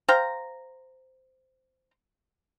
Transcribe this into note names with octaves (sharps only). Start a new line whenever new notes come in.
C5 F5 G5 A#5